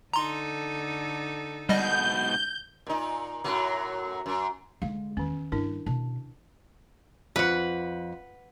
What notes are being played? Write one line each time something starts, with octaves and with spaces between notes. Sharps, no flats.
D3 D#4 A4 A#5 C6
G#2 B2 G3 D#5 G6
A#2 D#4
F#2 A2 F#3
F#2
D3 G#3 F5
E2 D#3 C#4
G2 D4 E4 A#4
B2 A5
F2 B4 F#5